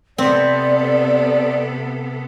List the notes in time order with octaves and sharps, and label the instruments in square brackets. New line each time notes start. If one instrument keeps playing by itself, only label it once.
[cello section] C3 B3 A4 [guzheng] C4 [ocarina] D5